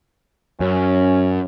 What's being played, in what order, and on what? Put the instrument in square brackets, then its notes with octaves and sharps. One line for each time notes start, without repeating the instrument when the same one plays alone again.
[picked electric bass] F#2 [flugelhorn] C#4